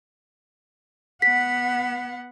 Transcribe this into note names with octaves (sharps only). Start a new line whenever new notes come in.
B3 F#5 B6